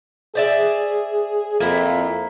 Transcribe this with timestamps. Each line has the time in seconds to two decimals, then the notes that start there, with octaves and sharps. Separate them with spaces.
0.35 G#4 C5 D5 E5
1.60 F2 A#3 E4